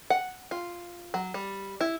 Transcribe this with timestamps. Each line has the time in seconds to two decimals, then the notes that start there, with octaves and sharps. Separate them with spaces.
0.10 F#5
0.51 F4
1.14 F#3
1.34 G3
1.81 E4